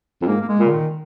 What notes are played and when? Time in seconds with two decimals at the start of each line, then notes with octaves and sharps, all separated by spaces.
0.22 F2
0.27 G#2 A#3
0.41 A#3
0.49 G#3
0.59 A#2 C#3
0.71 D#3